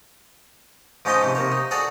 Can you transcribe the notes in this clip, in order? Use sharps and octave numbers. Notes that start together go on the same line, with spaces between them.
G#2 F3 C#4 D#4 D#5 G5
G#2 C3
C3 A#3 C#5
D#4
F#4 G#4 A4 C#5 D5